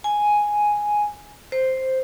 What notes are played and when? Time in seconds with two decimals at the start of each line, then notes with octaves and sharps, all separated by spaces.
0.04 G#5
1.52 C5